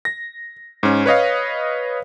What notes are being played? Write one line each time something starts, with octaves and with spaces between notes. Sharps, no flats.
A#6
G#2 C#4
B4 C#5 D#5 F5